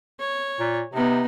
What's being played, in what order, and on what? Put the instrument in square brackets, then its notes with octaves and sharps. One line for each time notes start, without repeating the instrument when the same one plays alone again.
[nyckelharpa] C#5
[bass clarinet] A#2
[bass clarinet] C3 [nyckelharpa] B3 D#4